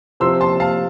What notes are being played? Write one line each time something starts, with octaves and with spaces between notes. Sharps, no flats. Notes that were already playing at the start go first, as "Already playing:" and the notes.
C3 F3 C4 C6 E6
A5 C6
F5 A5